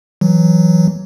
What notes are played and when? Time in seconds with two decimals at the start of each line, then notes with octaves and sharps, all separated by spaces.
0.21 E3 F#3